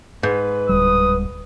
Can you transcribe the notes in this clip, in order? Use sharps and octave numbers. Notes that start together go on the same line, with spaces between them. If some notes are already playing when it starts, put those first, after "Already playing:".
G#2 B4
D1 G3 D#6